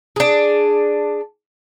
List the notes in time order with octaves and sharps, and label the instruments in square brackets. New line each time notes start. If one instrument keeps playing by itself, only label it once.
[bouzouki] D4 G#4